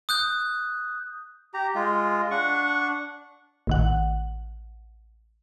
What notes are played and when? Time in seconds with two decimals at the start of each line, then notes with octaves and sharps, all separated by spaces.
0.09 D#6 F#6 G6
1.54 G4 A#5
1.75 G#3 F4
2.31 D4 F#5 C#6
3.67 A1 D#3 F#5